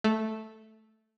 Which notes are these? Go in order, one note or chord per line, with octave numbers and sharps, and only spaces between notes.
A3